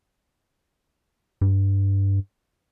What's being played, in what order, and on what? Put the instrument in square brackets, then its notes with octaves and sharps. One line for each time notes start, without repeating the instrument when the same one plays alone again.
[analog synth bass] G2